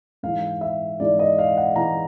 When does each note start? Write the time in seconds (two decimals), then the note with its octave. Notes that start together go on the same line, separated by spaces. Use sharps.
0.23 G#2 E3 F5
0.61 E5
1.00 G#2 E3 D5
1.19 D#5
1.39 F5
1.57 F#5
1.76 G#2 E3 A#5